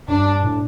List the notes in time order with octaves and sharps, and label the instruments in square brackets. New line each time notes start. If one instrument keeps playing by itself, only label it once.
[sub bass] G2 [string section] D4
[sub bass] A2